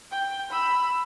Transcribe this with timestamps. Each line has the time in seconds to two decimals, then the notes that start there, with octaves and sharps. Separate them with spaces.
0.12 G5
0.50 B5 E6